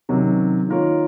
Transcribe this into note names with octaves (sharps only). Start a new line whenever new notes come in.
C3 D#3 F#3 C#4
D#3 A#3 F4 A#4 C#5